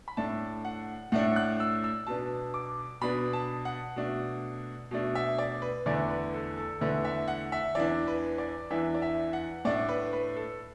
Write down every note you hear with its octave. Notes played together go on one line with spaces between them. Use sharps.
B5
A2 A3 D4 A5
F#5
A2 A3 D4 F#5
F#6
E6
E6
B2 B3 D4 A5
D6
B2 B3 D4 B5
A5
F#5
B2 A3 D4
B2 A3 D4
E5
D5
B4
E2 D3 A3 D4 D5
B4
A4
A4
E2 D3 A3 D4 B4
E5
F#5
E5
E2 E3 D4 D5
B4
D5
E2 E3 D4 E5
D5
E5
F#5
A2 A3 D4 D5
B4
B4
A4